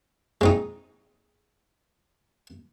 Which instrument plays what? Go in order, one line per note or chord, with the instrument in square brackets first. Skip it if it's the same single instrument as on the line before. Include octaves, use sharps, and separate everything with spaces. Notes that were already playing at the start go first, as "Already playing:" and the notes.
[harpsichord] G#3 C4 D#4